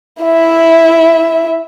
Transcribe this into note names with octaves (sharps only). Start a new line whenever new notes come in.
E4 E5